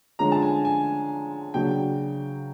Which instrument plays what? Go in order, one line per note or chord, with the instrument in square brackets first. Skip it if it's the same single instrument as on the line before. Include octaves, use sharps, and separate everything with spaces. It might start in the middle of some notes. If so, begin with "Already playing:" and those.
[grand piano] D3 F3 G#3 C#4 [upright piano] A#5
[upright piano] A5
G#5
G#5
[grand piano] C#3 F#3 A#3 D4 F#4 [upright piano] G5